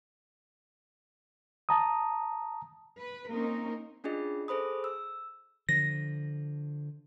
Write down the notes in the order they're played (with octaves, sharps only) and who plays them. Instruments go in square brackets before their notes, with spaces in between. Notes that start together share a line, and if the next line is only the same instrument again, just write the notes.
[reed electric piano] A5 A#5 D#6
[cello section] B4
A#3 C4 C#4 D#4 A#4
[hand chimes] C#4 D4 F4 G#4 D#5
G#4 A4 C5 B5 D#6
E6
[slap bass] D3 F3 [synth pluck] A#6